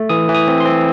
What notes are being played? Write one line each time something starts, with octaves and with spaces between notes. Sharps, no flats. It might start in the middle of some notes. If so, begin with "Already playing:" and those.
Already playing: A3
E3 D#6
E3
D#6
C4
C6
C4